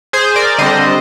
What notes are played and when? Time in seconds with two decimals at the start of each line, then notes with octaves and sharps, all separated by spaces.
0.13 G#4 C5
0.36 A#4 D5
0.58 D3 G3 C4 C5 D#5